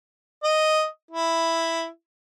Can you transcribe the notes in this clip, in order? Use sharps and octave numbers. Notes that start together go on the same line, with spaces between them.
D#5
E4